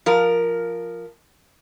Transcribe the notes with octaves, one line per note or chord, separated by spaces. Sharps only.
F3 A#4